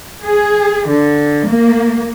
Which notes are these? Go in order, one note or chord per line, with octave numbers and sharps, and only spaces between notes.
G#4
D3
A#3